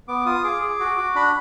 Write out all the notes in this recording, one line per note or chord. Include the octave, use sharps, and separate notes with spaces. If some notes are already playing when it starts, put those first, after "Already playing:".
B3 D6
F4 D#6
G#4 D6
G#4
F#4
F#4
D4 B5